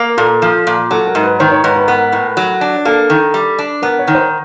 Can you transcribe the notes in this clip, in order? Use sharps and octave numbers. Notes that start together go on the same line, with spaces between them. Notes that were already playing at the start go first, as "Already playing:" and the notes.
Already playing: A#3
A#2 A4
F3
A#2
F#3 A4
A#4
G#2
B4
D#3 C5
C#5
G#2 B4
B4
B3 A#4
A2
F#3
D4
A#3 A4
D#3
G3
D4
B3 A#4
C#5
D#3
C5